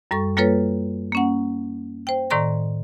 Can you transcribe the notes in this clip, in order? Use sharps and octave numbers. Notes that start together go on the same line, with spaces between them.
F#2 G3 A4 C#6
G3 A#3 F4 A4 B4 C#5
A#3 C#4 F#5
C5 G5
A2 D#3 D5 A#5 C6 A#6